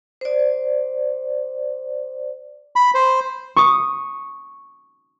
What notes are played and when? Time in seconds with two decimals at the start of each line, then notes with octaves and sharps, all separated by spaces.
0.21 C5 D5
2.76 B5
2.95 C5
3.56 C#6 D#6